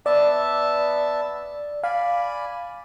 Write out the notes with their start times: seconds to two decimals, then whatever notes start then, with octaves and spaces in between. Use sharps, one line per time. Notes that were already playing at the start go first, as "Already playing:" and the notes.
0.06 B3 D5 E5 A5
1.84 D5 F5 G#5 B5